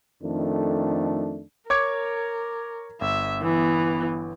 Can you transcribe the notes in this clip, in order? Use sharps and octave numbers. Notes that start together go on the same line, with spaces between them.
F2 D#3 A3 D4
A#4 C#5 D6 G#6
G1 E5
E3 B3